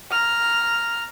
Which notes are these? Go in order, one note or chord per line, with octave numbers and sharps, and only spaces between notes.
A#5 F6